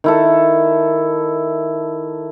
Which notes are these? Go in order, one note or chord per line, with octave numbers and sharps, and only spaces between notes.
D#3 E4 A4